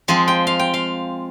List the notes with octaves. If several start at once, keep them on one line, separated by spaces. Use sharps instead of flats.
F3 G#3 C4 G#4
G5
F5
G5
F5